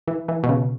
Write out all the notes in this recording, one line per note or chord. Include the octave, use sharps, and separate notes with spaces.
E3
E3
B2
C#3